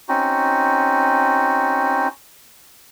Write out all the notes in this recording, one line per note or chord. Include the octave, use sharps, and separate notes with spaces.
C4 C#4 D#4 F#4